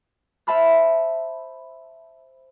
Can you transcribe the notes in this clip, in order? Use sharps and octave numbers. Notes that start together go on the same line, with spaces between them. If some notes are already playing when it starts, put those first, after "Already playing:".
C5 E5 A5 B5 F6